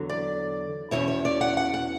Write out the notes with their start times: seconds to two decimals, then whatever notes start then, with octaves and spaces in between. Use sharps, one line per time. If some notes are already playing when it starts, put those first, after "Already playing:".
Already playing: E2 D3 F#3
0.09 D5
0.91 E2 B2 F#3 C#4 E4 C#5
1.08 C#5
1.25 D5
1.41 F#5
1.57 F#5
1.74 F#5